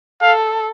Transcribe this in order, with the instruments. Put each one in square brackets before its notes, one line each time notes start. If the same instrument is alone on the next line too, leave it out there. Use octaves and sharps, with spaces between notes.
[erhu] A4 [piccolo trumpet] F5